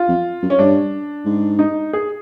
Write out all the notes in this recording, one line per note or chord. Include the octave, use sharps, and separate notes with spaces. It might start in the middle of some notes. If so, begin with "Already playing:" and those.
Already playing: F4
F2
F#2
C#4
G2 D4
G#2
D#4
G#4